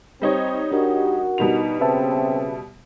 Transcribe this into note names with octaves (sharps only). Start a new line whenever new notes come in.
G3 C4 D#4 C#5
D4 F#4 G4 A#4
B2 G3 D#4 F7
C#3 C4 B4 E5 A5